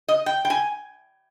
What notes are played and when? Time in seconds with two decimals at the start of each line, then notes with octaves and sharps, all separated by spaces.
0.08 D#5
0.26 G5
0.45 G5
0.50 G#5